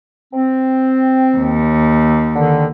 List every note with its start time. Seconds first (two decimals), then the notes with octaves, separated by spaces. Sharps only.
0.33 C4
1.37 D#2
2.36 D3 D#3